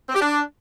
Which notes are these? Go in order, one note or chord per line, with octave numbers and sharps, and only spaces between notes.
C4
G4
D4